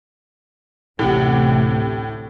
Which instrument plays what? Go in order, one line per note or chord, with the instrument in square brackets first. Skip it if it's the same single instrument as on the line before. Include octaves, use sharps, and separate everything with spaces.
[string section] A1 D2 C3 [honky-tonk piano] A2 G4 F#5